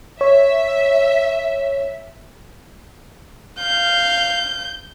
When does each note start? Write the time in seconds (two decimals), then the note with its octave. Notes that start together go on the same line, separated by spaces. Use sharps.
0.21 C#5 E5
3.59 F5 G6